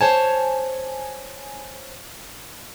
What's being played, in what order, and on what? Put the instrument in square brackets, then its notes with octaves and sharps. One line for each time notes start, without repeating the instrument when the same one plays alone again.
[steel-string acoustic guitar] C5 C#5 A5 [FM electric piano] G#5